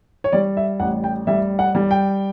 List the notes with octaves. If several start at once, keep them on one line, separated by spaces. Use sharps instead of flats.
C#5
G3 D5
E5
A1 F#5
G5
G3 E5
F#5
G3
G5